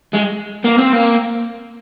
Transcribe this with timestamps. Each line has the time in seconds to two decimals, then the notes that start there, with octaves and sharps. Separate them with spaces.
0.13 G#3
0.65 A#3
0.78 C4
0.93 A#3